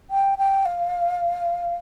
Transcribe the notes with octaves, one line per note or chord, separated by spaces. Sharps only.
G5
G5
F5